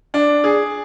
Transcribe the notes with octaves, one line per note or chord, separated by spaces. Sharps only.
D4
G#4